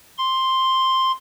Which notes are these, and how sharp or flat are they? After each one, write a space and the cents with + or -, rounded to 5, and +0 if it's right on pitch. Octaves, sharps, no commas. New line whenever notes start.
C6 +5